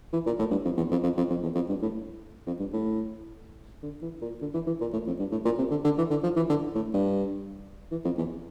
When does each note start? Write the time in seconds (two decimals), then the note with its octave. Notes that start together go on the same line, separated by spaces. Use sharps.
0.13 E3
0.26 A#2
0.39 A2
0.51 G2
0.65 F2
0.77 E2
0.91 F2
1.03 F2
1.17 F2
1.30 F2
1.43 E2
1.55 F2
1.69 G2
1.82 A2
2.47 F2
2.60 G2
2.73 A2
3.82 D3
4.02 E3
4.22 A#2
4.41 D3
4.54 E3
4.67 E3
4.81 A#2
4.93 A2
5.07 F2
5.19 G2
5.32 A2
5.45 A#2
5.58 C3
5.71 D3
5.84 D3
5.98 E3
6.10 D3
6.23 F3
6.36 E3
6.49 D3
6.75 A2
6.94 G2
7.91 E3
8.05 F2
8.18 E2